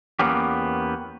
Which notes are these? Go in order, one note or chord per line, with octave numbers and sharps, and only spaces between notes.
E2 A#3 B3 C#4 G4